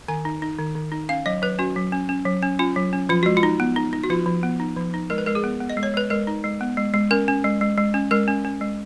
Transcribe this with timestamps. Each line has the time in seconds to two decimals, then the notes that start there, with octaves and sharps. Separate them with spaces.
0.08 D#3 G#5
0.25 D#4
0.42 D#4
0.59 D#3
0.75 D#3
0.92 D#4
1.09 C#4 F5
1.26 F#3 D#5
1.42 F#3 B4
1.59 C#4 F#4
1.76 F#3
1.92 C#4
2.09 C#4
2.26 F#3
2.42 C#4
2.59 C#4 F4
2.76 F#3
2.93 C#4
3.09 F3 F4
3.23 G#3 F#4
3.37 F4
3.43 D#4
3.60 B3
3.76 D#4
3.93 D#4
4.04 F#4
4.10 F3 F4
4.26 F3
4.43 B3
4.60 D#4
4.76 F3
4.94 D#4
5.10 G#3 A#4
5.18 B4
5.26 G#3 A#4
5.35 G#4
5.44 B3
5.61 B3
5.70 D#5
5.77 G#3
5.83 C#5
5.94 G#3 B4
6.10 G#3 A#4
6.27 D#4
6.44 G#3
6.61 B3
6.77 G#3
6.94 G#3
7.11 C#4 A#4
7.28 C#4
7.44 G#3
7.61 G#3
7.78 G#3
7.94 C#4
8.11 G#3 A#4
8.28 C#4
8.45 C#4
8.61 G#3